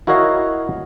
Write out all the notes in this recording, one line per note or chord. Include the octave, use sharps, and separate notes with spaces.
E4 F#4 A#4 C#5 D#5 F5